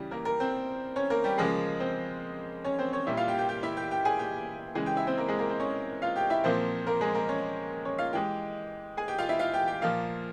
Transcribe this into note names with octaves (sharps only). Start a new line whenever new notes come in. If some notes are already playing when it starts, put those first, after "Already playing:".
Already playing: C#3 E3 G3 G4
A#3 A#4
A#3 A#4
C4 C5
C#4 C#5
A#3 A#4
G3 G4
C#3 F3 G#3 A#3 G#4
C4 C5
C#4 C#5
C4 C5
C#4 C#5
A#2 G3 A#3 E4 E5
F4 F5
G4 G5
G4 G5
G4 G5
E4 E5
G4 G5
G4 G5
G#4 G#5
G4 G5
C#3 E3 G#3 G#4 G#5
G4 G5
E4 E5
C4 C5
A#3 A#4
G#3 G#4
A#3 A#4
C4 C5
C#4 C#5
F4 F5
G4 G5
E4 E5
A#2 F3 A#3 C4 C5
A#3 A#4
G#3 G#4
A#3 A#4
C#4 C#5
C#4 C#5
F4 F5
E3 G#3 G4 G5
G#4 G#5
G4 G5
F4 F5
E4 E5
F4 F5
G4 G5
G4 G5
A#2 F3 A#3 F4 F5